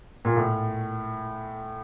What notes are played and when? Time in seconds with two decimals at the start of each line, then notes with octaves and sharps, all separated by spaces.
0.25 A#2
0.36 A2